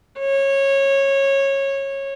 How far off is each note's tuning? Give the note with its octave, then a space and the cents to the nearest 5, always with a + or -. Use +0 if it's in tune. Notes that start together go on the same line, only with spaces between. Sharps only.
C#5 -20